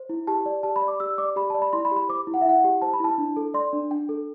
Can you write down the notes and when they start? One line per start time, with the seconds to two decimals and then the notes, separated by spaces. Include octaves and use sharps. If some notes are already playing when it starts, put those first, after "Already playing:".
Already playing: C5
0.09 E4
0.27 G4 A5
0.46 D5
0.63 G4 A5
0.76 B5
0.82 D5
0.88 D6
1.00 G4 E6
1.18 D5 D6
1.36 G4 B5
1.50 D5 A5
1.62 B5
1.73 E4 C6
1.85 B5
1.91 G4
1.96 B5
2.09 C5 D6
2.27 E4
2.34 F#5
2.41 E5
2.45 E4 F#5
2.64 G4
2.82 C5 A5
2.94 B5
3.00 E4 A5
3.18 D4
3.37 A4
3.54 D5 C6
3.73 D4
3.91 D4 G5
4.09 A4